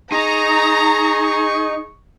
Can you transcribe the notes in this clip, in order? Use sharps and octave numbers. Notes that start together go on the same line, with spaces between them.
D#4 G#4 A#5 C#6